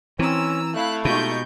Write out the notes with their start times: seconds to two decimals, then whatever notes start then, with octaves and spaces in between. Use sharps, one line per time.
0.19 E3 C4 C#4 A#5 E6
0.74 A3 E4 F5 F#6
1.05 B2 G#3 D#4 F4 G4 C#6 G6